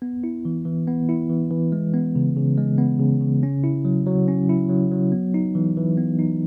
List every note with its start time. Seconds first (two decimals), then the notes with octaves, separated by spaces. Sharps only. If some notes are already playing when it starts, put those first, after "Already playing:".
0.02 B3
0.24 E4
0.45 E3
0.66 E3
0.87 B3
1.09 E4
1.29 E3
1.51 E3
1.72 G#3
1.93 B3
2.16 C#3
2.37 C#3
2.58 G#3
2.78 B3
2.99 C#3
3.21 C#3
3.43 C#4
3.64 E4
3.85 F#3
4.07 F#3
4.28 C#4
4.49 E4
4.69 F#3
4.91 F#3
5.12 B3
5.34 D#4
5.55 E3
5.77 E3
5.98 B3
6.19 D#4